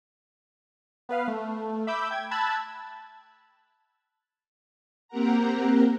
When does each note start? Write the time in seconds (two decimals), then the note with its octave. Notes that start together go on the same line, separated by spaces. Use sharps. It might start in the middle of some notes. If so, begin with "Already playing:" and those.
1.09 B3 B4 F5
1.28 A3
1.87 E5 B5 D6 E6 G6
2.11 G5 G#6
2.31 A5 B5 E6 F#6 G#6 A6
5.08 A#3 C4 G4 A#4 F#5 A#5